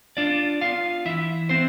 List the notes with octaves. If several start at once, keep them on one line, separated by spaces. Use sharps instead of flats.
D4 F4 D5
B3 F4 F5
E3 E4 E5
B3 C4 C5